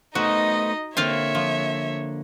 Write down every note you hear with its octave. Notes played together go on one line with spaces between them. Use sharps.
A3 B3 D#4 F#4 C5 D#5
D3 A#3 C4 F4 C#5 E5 F5
F3